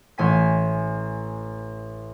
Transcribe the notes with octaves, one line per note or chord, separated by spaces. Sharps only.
A1 G#5 B6